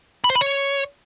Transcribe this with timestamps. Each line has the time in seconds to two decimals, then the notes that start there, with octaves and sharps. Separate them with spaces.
0.24 B5
0.30 C5
0.35 B5
0.41 C#5